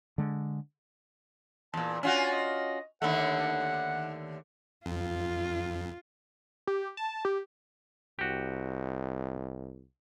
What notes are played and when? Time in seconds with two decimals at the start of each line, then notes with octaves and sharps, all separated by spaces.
0.18 D3 G#3
1.74 E2 A#2 A5
2.03 C#4 F4 F#4 G#5
2.33 D#5
3.02 D#2 D3 A3 F#5
4.86 F2 F4
6.67 G4
6.97 A5
7.25 G4
8.19 C2 F#4 G4